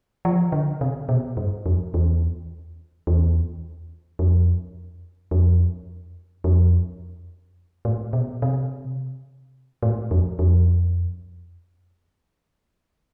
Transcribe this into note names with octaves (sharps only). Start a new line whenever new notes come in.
F3
D3
C3
B2
G2
F2
E2
E2
F2
F2
F2
A2
B2
C3
A2
F2
F2